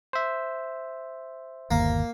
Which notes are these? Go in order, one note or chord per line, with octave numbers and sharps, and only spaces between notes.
C5 E5
G1 D#2 A#3